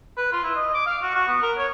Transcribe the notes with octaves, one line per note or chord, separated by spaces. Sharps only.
B4
F4
E4
D#5
D6
F5
F#4
F#4
B3
A#4
C#5